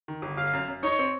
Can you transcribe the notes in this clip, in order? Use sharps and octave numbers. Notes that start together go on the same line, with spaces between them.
D#3
G1
G1 F5
F#2
F#2
D#4 C#5
C4